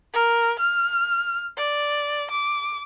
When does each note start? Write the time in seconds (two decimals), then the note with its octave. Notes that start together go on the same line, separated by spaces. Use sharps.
0.14 A#4
0.59 F6
1.58 D5
2.31 D6